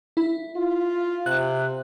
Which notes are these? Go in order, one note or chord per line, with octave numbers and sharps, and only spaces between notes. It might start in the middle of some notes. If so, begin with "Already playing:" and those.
E4
F4
C3 F#6